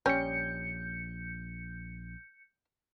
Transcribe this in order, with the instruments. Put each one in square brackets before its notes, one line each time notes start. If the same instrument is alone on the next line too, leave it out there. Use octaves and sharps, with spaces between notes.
[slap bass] A#1 [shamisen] G3 C#4 [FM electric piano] G6 C#7